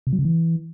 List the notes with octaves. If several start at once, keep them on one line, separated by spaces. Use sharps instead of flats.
C3
F#3
C#3
E3